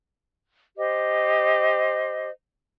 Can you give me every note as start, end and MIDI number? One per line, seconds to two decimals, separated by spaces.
0.78 2.29 67
0.78 2.29 72
0.78 2.29 75